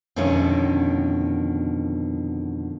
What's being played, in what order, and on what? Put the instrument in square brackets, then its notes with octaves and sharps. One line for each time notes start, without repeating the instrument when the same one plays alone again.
[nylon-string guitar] F2 B2 D3 D#3 A3 C#4